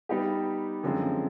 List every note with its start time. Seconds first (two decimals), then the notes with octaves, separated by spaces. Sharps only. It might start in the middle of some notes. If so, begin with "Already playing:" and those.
0.09 G3 B3 D#4 G4
0.83 F#2 D3 F3 G#3 C4